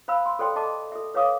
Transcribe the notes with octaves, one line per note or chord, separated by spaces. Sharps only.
C5 F5 B5 E6
C6
A4 C5 D5 G5 C6
A4 D#5 A5 D6
A4 E5
B4 C#5 E5 F5 D6 D#6